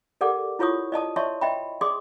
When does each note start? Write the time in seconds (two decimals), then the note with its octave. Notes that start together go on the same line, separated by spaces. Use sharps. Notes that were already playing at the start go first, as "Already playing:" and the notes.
0.21 G4 A4 A#4 D5 F#5 D6
0.59 E4 F4 C#5 C#6 D#6
0.92 D5 D#5 A5 D#6
1.16 C#5 D5 E5 A5 C6 C#6
1.41 D#5 E5 G5 B5
1.81 G#4 D5 C6 D6 D#6